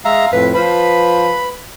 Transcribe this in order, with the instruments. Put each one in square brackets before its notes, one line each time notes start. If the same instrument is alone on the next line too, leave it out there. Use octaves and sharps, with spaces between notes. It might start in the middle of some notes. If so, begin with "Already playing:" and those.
[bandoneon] G#3 E5 A#5 [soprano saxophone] F5
[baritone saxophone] F2 [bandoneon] A2 [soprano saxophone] B4
[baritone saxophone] F3 [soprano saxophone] B4 [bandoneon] B5